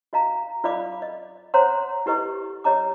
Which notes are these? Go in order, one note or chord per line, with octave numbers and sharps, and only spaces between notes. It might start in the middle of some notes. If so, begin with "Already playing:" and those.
F#4 D#5 F5 A#5
F4 D5 D#5 F5 B5 D6
D#5
C5 C#5 F#5 A#5 C6
E4 G4 B4 D#5 C#6
G4 C#5 D#5 A#5 D6